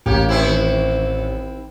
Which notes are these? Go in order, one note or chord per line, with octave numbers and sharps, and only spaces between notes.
A1 A#3 G4
D#3 C4 E4